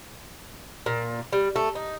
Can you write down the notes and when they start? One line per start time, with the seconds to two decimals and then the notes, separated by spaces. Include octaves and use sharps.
0.86 A#2
1.33 G3
1.56 A3
1.75 D#4